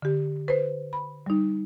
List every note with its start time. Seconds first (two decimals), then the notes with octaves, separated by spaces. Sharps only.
0.02 D3 G4
0.48 B4 C5
0.93 B5
1.26 G3 D#4